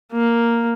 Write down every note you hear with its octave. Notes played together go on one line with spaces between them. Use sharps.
A#3